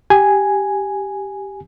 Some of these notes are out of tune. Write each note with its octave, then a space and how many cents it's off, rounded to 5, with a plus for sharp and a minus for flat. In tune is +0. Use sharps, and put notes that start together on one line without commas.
G4 +0 G#5 +0